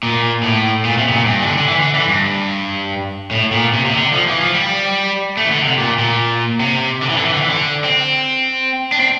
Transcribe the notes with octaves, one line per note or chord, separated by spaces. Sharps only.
A#2
A2
A#2
C3
C3
A#2
G2
E3
D3
D3
E3
D3
E3
G2
A2
A#2
C3
C3
D3
F3
E3
F3
G3
A3
E3
D3
C3
A#2
A#2
C3
D3
E3
D3
E3
D3
E3
D3
C4
D4
C4